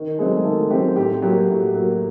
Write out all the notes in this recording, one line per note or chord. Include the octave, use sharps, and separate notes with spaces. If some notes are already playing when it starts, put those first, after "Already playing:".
Already playing: D#3
F#3 G#3 A3 C4 G#4
D#3 A3 A4
F#3 A3 C4 G4
A2 G4
F#3 A#3 G4
A2
F#3 A#3